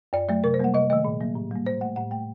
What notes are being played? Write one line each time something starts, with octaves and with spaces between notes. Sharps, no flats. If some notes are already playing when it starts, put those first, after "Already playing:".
F#2 D5
F#3 A3 D5
C3 A#4
C5
G3 A#3 F#5
C3 D#5
D#3 A3 D#5
A#2
F#3 A#3
A2
G3 A#3
A2 C5
A3 F#5
A2 F#5
A3 G5